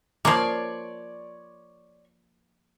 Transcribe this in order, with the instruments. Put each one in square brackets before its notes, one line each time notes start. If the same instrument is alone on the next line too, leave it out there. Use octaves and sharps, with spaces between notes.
[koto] F3 A#3 [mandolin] C#5 D5 C6